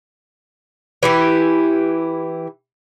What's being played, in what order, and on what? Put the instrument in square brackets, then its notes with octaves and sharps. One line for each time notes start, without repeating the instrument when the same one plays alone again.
[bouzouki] E3 E4 G4